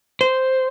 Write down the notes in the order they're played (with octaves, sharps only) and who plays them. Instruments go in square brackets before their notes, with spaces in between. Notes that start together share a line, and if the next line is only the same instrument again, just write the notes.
[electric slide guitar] C5